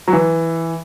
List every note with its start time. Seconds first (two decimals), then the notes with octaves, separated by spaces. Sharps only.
0.08 F#3
0.13 E3